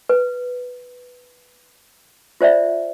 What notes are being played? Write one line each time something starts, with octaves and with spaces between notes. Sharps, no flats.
B4
F4 C5 D5 E5